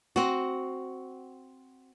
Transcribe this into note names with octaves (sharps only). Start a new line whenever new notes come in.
C4 F#4